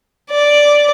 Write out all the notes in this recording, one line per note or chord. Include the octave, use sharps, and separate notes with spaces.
D5